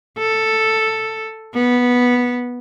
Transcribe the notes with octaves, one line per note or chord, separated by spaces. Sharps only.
A4
B3